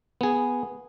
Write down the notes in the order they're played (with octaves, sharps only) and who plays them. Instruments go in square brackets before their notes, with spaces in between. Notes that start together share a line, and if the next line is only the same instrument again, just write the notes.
[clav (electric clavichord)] B3 G#4